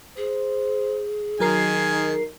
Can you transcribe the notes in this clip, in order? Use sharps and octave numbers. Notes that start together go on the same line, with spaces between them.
G#4 C5
D#3 F#3 D#4 A#4 G#5 C7